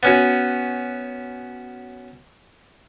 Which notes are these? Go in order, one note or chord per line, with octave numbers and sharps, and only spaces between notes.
B3 C#4 F#4